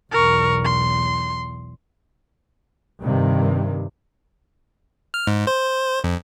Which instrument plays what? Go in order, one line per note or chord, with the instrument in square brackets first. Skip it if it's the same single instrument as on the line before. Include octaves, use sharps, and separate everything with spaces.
[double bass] B1 E2 [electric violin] A#4 C#6
[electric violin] C6
[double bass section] G2 C3 D#3
[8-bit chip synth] F6
G#2
C5
F2